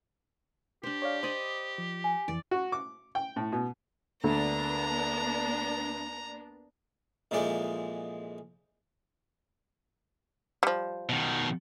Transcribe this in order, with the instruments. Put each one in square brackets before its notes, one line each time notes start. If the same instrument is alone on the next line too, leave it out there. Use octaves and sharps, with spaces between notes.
[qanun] D4 C5 [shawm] G4
[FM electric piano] C#5 D5 F5
[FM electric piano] C5 [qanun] D5 D#5 B5
[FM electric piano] F3
[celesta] G#5
[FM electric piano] F2 E3 [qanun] D5
[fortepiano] F#4
D6
G5
A2
B2
[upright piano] D2 [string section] A#3 B3 D4 [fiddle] A#5
[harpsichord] F2 A#2 E3 G#3 D5 G5
[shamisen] F3 G3
[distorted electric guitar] B2 D#3